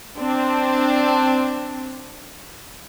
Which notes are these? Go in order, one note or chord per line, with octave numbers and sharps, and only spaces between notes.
C4 D4